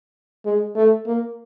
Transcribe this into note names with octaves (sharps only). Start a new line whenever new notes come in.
G#3
A3
A#3